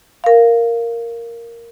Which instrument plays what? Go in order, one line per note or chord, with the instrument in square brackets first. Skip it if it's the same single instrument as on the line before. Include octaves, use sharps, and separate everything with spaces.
[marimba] A#4 F5